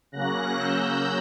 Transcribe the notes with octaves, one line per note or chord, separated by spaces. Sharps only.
C#3 F#3 A#3 C#4 F#6 A#6
E6 G6